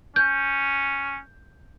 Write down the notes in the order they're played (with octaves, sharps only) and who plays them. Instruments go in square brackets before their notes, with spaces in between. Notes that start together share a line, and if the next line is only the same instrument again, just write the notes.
[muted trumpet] C#4 [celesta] G6